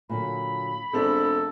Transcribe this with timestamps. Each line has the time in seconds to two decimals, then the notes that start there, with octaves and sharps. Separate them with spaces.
0.09 A#2 D3 F#3 B5
0.93 E1 C4 D4 F4 G#4 A4